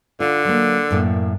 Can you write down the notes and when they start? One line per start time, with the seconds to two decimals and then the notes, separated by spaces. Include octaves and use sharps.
0.20 D3 F4
0.45 F#3 A#3
0.91 F#2 A2 A#3